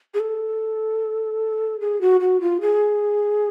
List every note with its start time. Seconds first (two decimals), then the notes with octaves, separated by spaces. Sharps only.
0.14 G#4
0.20 A4
1.80 G#4
2.01 F#4
2.20 F#4
2.41 F4
2.61 G#4